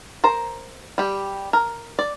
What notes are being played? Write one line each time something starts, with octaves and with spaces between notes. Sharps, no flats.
A#4 C5 A#5
G3 G4
A#4
D5